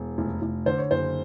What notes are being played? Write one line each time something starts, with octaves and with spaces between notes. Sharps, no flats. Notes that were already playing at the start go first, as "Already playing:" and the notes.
Already playing: E1
F1
F1
D3 C5
C#5
F#1 C5